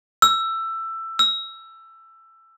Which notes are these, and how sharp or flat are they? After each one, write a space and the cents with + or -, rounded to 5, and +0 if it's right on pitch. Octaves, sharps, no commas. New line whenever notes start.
E6 +15
E6 +15